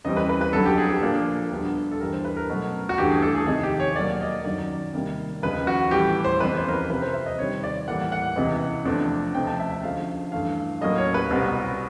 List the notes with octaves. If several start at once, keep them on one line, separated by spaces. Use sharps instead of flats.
C#2 C#3 E3 G3 C4 D#5
B4
B4
B4
F2 D3 F#3 A4
G4
G#4
G4
A#2 F3 A#3 D4
D2 D3 G3 B3
A4
G2 E3 G3 A#4
C5
B4
A#4
B2 F#3 A3 C#4
F#4
G2 E3 A3 G4
G#4
A4
G#4
F2 C3 D#3 G#3 G#4
G4
C#5
B2 F#3 A#3 D5
D#5
F#2 D#3 F#3 D5
C3 D#3 G3 A#3
D#2 C#3 F3 G#3 B4
F#4
A2 E3 G3 G4
C5
F2 C#3 E3 G#3 B3 B4
C5
A#4
B4
F2 C3 F3 B4
C5
E5
D#5
C3 D#3 G3 C#5
D5
A2 E3 G3 A#3 F#5
F#5
C#2 C3 E3 G#3 B3
E2 C3 F3 A3 D4
C#2 C3 F3 A3 C4 G5
A5
E5
E5
D2 D3 F3 G#3 C#4 F5
G2 E3 A3 F5
A2 F#3 A#3 C#4 D#5
C#5
B4
C2 B2 G3 C4